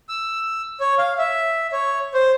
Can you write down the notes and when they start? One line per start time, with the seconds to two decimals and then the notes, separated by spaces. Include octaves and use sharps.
0.09 E6
0.80 C#5
0.98 F5
1.18 E5
1.73 C#5
2.14 C5